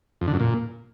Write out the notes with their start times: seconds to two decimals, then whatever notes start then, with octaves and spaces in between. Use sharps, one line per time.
0.21 F2
0.27 D3
0.34 F#2
0.40 A#2